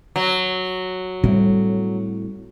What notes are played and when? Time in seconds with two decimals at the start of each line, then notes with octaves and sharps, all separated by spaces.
0.16 F#3
1.24 A2 G3 C4